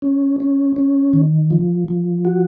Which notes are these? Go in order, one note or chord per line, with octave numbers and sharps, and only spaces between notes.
C#4
C#4
C#4
D#3
F3
F3
F#4